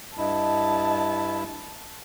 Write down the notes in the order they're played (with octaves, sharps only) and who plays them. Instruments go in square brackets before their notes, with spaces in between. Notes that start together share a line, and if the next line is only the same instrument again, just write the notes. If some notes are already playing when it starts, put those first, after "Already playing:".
[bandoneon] G2 E4 [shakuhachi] D#5 [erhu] A5